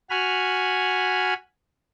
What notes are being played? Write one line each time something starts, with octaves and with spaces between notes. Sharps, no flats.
F#4 G#5 B5 F6